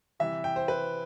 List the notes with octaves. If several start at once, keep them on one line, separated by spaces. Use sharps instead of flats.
C3 E3 G3 E5
G5
C5
B4